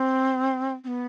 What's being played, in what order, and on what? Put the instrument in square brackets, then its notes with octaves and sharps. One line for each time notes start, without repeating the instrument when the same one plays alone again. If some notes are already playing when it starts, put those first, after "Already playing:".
Already playing: [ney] C4
C4
B3